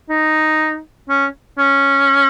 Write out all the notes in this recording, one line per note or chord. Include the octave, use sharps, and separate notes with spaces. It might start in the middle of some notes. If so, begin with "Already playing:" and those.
D#4
C#4
C#4